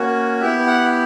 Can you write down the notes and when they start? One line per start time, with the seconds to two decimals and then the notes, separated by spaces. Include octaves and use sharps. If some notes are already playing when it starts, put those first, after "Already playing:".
Already playing: A#3 C#4 F#4
0.41 B3 E4 G4 E5
0.67 F#5